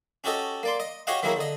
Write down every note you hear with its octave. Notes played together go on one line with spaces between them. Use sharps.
C#4 F#4 G4 A4 D#5
A#3 D5 C6
D#5
F#4 G4 C#5 D#5 F5 F#5
D#3 F#3 A#3 E4 G#4 A#4
D3 D#5